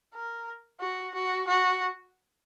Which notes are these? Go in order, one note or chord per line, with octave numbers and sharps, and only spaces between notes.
A#4
F#4
F#4
F#4